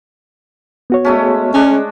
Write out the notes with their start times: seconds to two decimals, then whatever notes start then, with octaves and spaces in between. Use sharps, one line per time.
0.90 B3 F#4 C#5
1.05 G#3 A3 C#4
1.54 G#3 C#4 D4